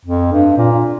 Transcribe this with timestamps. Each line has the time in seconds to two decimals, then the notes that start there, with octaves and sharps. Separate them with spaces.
0.05 F2
0.32 G2
0.58 A#2